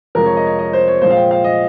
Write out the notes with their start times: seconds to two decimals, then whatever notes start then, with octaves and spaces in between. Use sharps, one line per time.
0.15 F2 C3 F3 G#3 A#4
0.26 C#5
0.37 D#5
0.47 C#5
0.59 D#5
0.73 C5
0.88 C#5
1.01 A#2 F3 G#3 C5
1.11 F5
1.16 G5
1.31 F5
1.44 D#5